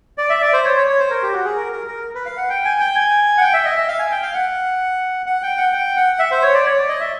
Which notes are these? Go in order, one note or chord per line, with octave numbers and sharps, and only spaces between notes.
D5
E5
D5
C5
C#5
C#5
C#5
C5
A#4
G4
F#4
G#4
A#4
A#4
A#4
B4
F5
F#5
G5
G#5
G5
G#5
F#5
G5
E5
D#5
E5
F5
G#5
G5
F5
F#5
F#5
G5
F#5
G5
F#5
E5
C5
C#5
D5
C#5
D5
D#5
E5